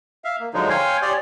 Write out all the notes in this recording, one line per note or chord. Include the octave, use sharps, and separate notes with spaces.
E5 F5
A#3
D3 F3 F#3 G#3 D#4
C#5 F5 G5 G#5 C6
G4 C#5 D5 G#5 C6 D#6